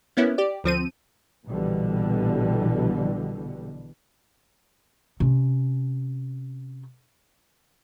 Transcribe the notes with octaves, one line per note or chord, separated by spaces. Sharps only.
A#3 B3 C#4 E4
G4 D5
D2 F3 C4 D#7
A#1 B2 D3 E3 G3
C3 C#4